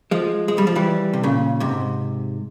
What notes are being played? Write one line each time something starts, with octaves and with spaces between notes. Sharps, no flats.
F3 G#3
G#3
G3
F3
E3 G3
C3
A#2 C#3
G#2 C3